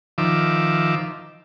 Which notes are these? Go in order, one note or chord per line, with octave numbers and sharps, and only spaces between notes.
D#3 F3 E5 D6